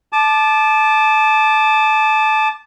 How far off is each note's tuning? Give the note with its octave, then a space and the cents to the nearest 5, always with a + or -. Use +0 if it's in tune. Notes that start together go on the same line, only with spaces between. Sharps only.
A5 -20 D6 +20